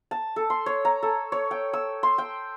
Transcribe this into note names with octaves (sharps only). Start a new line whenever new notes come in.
A5
A4
C6
C#5
A#5
A4
C#5
G5
E6
C6
G5